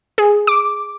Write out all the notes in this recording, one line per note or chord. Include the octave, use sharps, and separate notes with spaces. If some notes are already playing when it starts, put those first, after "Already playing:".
G#4
D6